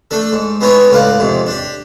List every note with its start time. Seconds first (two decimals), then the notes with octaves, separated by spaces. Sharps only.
0.11 A3 D4 A4
0.33 G#2
0.61 G#3 B3 D#4 E4 C#5
0.90 C#2 A2 D5 F5 F#5
1.19 F2 G#2 C3
1.47 D4 G4